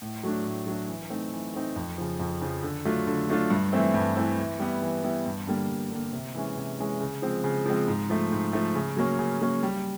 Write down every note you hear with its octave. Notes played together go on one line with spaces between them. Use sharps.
A2
F#3 A3 D4
A2
F#3 A3 D4
E3
A3 C4 D#4
E3
A3 C4 D#4
F2
C#3 F3
F2
C#3 F3
D3
F#3 A3 D4 F4
D3
F#3 A3 D4 F4
G2
E3 A3 C4 E4
G2
E3 A3 C4 E4
E3
G3 B3 E4
E3
G3 B3 E4
G2
D3 G3 A#3
G2
D3 G3 A#3
C3
E3 G#3 C#4
C3
E3 G#3 C#4
C#3
F3 G#3 C4
C#3
F3 G#3 C4
G#2
F3 A3
G#2
F3 A3
C#3
F#3 A#3 C#4
C#3
F#3 A#3 C#4
G3